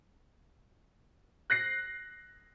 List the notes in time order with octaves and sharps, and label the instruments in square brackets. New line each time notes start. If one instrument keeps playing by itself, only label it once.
[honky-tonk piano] F#6 A#6 C7